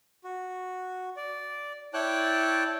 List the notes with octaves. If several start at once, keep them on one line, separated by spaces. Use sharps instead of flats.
F#4
D5
E4 C#5 D5 G5 A5 F#6